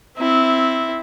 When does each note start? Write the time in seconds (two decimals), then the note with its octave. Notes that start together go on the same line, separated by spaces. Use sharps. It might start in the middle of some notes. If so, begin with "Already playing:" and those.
0.17 C4 E4